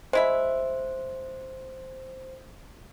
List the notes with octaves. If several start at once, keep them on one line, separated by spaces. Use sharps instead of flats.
G#3 E4 C5 E5